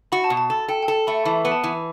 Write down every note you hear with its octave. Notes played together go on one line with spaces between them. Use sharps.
F#4 B5
A5
B2
A5
A4 A5
A4 G5
G5
A4 A5
A3 B5
E3 A5
B5
B3
A5
E3